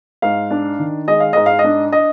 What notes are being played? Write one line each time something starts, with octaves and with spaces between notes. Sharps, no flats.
G#2 F5
D4
D#3
G#3 D#5
F5
G#2 D#5
F5
D#5
D4
D#5